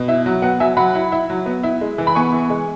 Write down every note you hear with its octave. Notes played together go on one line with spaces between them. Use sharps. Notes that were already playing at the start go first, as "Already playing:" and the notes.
Already playing: B2
E4 E5
F#3
B3 F#5
F#3 E5 G#5
F#3 F#5 B5
E4
E4
F#3
B3
E4
G#3
E3
B5
B3 G#5 C#6
E3
G#3